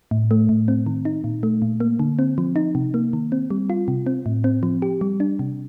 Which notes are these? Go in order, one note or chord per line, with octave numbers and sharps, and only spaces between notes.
A2
A3
A2
C4
D#3
D#4
A#2
A3
A#2
A#3
D3
C4
F3
D#4
C3
A#3
D#3
C4
G3
F4
C3
C4
A2
C4
F3
G4
G3
D4
C3